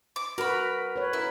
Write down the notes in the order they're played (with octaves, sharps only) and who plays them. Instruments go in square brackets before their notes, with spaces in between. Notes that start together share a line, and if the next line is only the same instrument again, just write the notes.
[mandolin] D6
[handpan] F#4 B4 [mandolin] A#4 B5
[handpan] B4 C#5
[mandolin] E4 [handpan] A#4